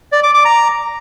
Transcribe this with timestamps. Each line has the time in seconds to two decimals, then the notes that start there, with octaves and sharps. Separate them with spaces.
0.12 D5
0.23 D6
0.34 D6
0.45 A#5